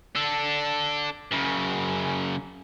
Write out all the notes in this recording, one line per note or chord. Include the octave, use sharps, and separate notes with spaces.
D4 A4
F#2 C#3